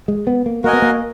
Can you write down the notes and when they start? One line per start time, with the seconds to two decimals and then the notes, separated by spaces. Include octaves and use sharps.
0.08 G#3
0.27 B3
0.46 A#3
0.64 A#3 F#4 A#4 D#5 G#5
0.73 B3
0.82 A#3